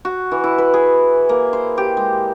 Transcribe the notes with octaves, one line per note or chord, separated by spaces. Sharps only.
F#4
E3
E4
B4
G#4
A#3
C5
G4
G#3